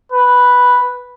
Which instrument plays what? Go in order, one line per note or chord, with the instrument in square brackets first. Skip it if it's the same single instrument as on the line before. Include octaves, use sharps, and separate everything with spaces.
[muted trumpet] B4